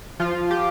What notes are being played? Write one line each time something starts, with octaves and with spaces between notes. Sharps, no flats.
F3 F4
G4